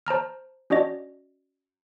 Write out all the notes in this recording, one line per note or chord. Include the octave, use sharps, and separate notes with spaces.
C5 A5 A#5 F6
C#4 D4 F#4 D5 D#5